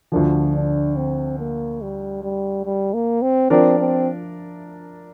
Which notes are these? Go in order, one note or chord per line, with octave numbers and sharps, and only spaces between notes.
D2 D3 F3
D4
C4
A#3
G3
G3
G3
A#3
C4
F3 C4 D4 A#4 D5
C4